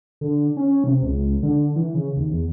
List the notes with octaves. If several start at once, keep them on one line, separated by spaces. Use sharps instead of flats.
D3
C#4
C3
C#2
D3
E3
C#3
D#2
E2